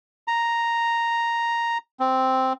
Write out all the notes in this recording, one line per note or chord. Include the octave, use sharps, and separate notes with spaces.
A#5
C4